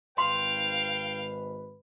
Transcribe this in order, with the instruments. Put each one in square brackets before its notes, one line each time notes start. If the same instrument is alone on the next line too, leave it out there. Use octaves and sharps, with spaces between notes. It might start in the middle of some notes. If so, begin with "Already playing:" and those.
[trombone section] G#1 G#2 B4 [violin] F5 [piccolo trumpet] G5 [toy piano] C6